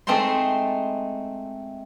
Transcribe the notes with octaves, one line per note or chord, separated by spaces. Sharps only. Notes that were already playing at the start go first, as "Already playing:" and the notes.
G#3 A3 C4 D#4 C5 C6